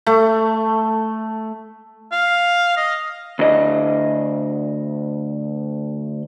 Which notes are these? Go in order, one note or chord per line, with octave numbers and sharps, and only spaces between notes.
A3
F5
D#5
D2 D#5